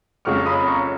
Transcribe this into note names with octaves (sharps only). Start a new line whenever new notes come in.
F#1 F2 C#3 G#3 C#6 F6
B5 D#6
A#5 C#6